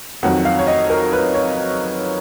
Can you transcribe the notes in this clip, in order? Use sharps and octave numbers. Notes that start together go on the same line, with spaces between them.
F2 D#3 F#3 F#5
F5
C#5
D#5
A#4
B4
C#5